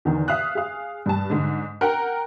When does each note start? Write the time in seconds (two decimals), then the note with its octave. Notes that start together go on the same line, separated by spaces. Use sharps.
0.05 E2 D3 D#3
0.28 E5 F5 D#6 F#6
0.55 G#4 F5
1.06 G2 A5
1.30 G#2 D3
1.81 A#4 F#5 G5 A#5